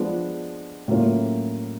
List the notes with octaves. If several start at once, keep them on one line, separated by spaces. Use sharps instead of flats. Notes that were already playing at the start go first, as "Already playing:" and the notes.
Already playing: F3 G#3 B3 D4
A2 F#3 A#3 C#4 F4